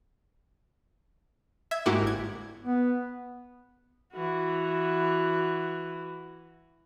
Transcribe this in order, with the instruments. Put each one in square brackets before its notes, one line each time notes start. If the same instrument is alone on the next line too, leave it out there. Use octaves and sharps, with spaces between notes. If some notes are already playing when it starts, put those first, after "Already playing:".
[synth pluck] E5 G#6
G#2 A#3 E4 F#4 G4
G1 G#6
[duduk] B3
[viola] E3 F#4